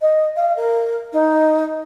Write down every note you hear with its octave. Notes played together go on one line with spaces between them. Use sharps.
D#5
F5
A#4
D#4